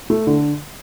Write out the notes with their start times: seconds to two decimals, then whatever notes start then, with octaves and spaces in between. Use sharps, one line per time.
0.10 A3
0.27 D3